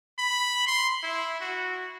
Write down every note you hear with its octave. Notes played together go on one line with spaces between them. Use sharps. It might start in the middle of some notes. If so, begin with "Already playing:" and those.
B5
C6
E4
F#4